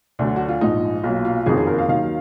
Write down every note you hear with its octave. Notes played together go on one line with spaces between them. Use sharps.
D2 D3 F#3 D4
F#4
F4
A#1 G#2 F3 D#4
B1 A#2 F#3 F4
F4
F#1 F2 D#3 F#3 G#4
G#4
A#4
F5
D#2 D#3 F#3 F5